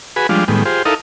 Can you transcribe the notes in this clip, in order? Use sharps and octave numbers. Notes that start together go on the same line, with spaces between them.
F#4 G#4 B4 G#5 B5
F3 G3 G#3 D4 F4
A2 D#3 G3 G#3 B3
F4 G4 G#4 C5
D#4 E4 A4 A#4 D#5 F5